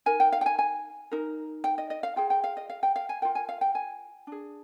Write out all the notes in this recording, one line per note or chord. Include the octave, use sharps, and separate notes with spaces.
D#4 A#4 G#5
G5
F5
G5
G#5
G#5
D#4 A#4
G5
D#5
D#5
F5
F4 G#4 G5
G5
F5
D#5
F5
G5
F5
G#5
F4 A#4 G5
G#5
F5
G5
G#5
D4 G#4